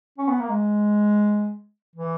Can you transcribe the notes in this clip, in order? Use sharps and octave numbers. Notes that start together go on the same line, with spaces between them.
C#4
B3
A#3
G#3
E3